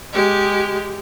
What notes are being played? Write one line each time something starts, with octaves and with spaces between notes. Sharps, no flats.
G#3 G4